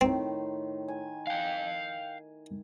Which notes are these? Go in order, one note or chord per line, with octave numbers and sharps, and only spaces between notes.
A2 D#3 C4 C6
G#5
F5 G5